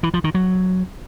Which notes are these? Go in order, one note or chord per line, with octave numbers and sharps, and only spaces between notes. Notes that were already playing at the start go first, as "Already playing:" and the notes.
E3
F3
D#3
F#3